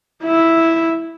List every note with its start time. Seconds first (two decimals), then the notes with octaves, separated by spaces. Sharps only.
0.23 E4 E5